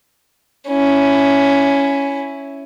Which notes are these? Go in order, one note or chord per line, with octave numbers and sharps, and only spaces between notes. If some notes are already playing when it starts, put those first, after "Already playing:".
C#4 E4